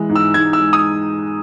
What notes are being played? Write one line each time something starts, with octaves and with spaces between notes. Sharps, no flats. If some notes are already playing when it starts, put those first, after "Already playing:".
Already playing: E3 G#3
G#2
E6
G#2 G#6
E6
G#3
D#6